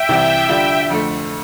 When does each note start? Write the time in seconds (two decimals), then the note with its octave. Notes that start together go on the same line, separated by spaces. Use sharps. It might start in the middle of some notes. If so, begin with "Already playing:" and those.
Already playing: E5 G5
0.09 C2 C3 E3
0.48 D3 G3 D4 F4
0.90 F2 D3 A3